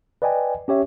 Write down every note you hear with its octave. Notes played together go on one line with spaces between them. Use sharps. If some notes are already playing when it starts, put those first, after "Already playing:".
B4 D5 D#5 G5 G#5
C#4 G4 C#5 E5